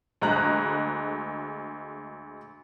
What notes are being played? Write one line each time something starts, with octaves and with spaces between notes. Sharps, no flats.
D2 G#3 A#5 F#6